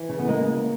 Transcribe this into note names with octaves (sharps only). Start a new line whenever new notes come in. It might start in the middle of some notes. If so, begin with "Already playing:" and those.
Already playing: E3
C#3
B3
G#3 A#3